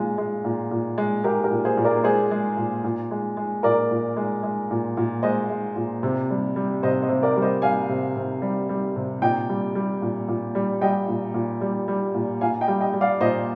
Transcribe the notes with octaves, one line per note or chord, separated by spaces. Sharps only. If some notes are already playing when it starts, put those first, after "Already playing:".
Already playing: A#2 G#3 F4 G#4
G#3
A#2
A#2
G#3
G#3 G4 A#4
G4 A#4
A#2
G#4 C5
A#2
A#4 D5
G#3 G#4 C5
G#3
A#2
A#2
G#3
G#3
A#2 A#4 D5
A#2
G#3
G#3
A#2
A#2
G#3 C5 D#5
G#3
A#2
C3
G3
G3
C3 C5 D#5
C5 D#5
C3
A#4 D5
G3
C5 D#5
G3 F5 G#5
C3
C3
G3
G3
C3
A#2 D#5 G5
G3
G3
A#2
A#2
G3
G3 D#5 G5
A#2
A#2
G3
G3
A#2
A#2 F5 G#5
D#5 G5
G3
D#5 G5
G3
D5 F5
A#2 C5 D#5